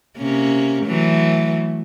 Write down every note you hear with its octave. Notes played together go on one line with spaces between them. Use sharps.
C3 A#3 C#4
E3 F#3 A3